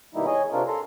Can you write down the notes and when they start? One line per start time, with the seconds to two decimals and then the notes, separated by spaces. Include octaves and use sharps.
0.15 B2 D#3 G3 A#3 D#4 E4
0.26 G#4 C#5 D#5 G#5
0.52 C3 C4 D4 F4 A#4
0.67 A4 A#5 C6